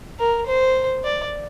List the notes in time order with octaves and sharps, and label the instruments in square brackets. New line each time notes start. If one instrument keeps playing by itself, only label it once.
[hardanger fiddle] A#4
C5
D5